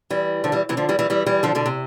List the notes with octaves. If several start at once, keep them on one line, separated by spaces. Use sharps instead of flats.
E3 G3
D3 F3
E3 G3
C3 E3
D3 F3
E3 G3
E3 G3
E3 G3
E3 G3
D3 F3
B2 D3
C3